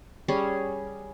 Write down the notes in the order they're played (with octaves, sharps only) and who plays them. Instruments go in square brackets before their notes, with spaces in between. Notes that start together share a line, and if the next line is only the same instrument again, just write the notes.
[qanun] G3 C#4 G#4